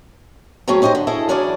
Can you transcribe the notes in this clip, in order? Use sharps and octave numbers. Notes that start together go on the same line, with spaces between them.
F#3 A3 C4 C#4 G#4
C#4 D#4 G4 C5 D#5
D3
E4 G#4 A4 D#5
F#2 E3 C#4 D4 G#4 D5